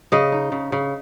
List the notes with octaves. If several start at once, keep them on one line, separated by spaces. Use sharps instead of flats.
C#3 D#5
D#4
C#3
C#3